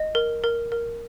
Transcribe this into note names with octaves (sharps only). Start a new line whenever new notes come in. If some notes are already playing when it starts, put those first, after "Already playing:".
Already playing: D#5
A#4
A#4
A#4